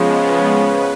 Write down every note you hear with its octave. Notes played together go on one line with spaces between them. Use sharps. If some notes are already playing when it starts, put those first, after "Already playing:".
Already playing: C#3 F3 G#3 B3
C#4
B4